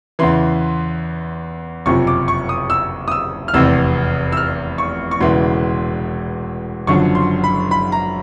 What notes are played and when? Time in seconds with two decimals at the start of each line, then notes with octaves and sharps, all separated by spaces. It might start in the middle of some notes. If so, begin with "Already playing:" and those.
0.19 E2 C#3 E3 C6
1.86 F#1 F2 C3 F3 C#6
2.07 D6
2.28 C#6
2.49 D#6
2.70 E6
3.08 D#6
3.11 E6
3.48 F6
3.54 F1 E2 C3 E6
4.32 E6
4.37 F6
4.78 C#6
5.11 C#6
5.20 E1 E2 C#3 E3 C6
6.87 F#1 F#2 D3 F3 C#6
7.15 C6
7.44 B5
7.71 B5
7.92 A#5